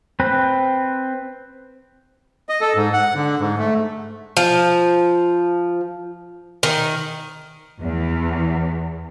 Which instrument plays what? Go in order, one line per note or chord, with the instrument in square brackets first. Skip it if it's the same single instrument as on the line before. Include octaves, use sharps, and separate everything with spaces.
[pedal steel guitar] C4 B4
[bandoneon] D#5
A4
G#2
F#5
D3
G#2
A3
[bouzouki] F3
D#3
[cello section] E2